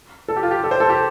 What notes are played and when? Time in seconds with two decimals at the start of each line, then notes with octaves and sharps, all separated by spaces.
0.28 A4
0.37 G4
0.43 F4
0.51 G4
0.64 A4
0.71 C5
0.80 A4
0.90 G4